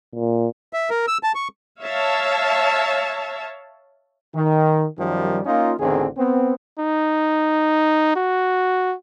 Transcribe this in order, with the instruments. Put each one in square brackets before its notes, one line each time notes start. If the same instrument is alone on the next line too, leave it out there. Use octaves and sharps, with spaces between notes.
[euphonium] A#2
[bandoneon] E5
A#4
E6
A5
C#6
[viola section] C#5 E5 F5 A5
[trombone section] D#3
F#2 D#3 F3 G3
A#3 C#4 D#4 F4
A1 E2 D3 D#3 C4 G#4
B3 C4
[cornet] D#4
F#4